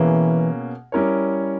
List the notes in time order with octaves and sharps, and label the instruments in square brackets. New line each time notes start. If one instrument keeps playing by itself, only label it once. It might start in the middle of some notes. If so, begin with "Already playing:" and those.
Already playing: [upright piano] B2 A#3 C#4 G#4 [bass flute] E3
[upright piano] G3 C#4 E4 A#4 C#5